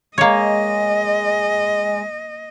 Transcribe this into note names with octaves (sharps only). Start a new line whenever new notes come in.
G#3 A#3 C#5 D#5